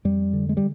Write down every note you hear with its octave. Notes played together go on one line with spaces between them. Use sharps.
F2 G3
D3
G#3
G3